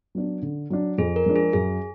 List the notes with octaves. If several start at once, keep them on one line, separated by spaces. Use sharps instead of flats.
F#3 B3 D4
D3
F#3 D4
F2 G#4
A#4
F3 G#3 D4
G#4
F#2 G#4